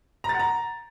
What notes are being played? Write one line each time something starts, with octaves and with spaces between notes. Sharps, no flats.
A#5
A6
F#5
A#5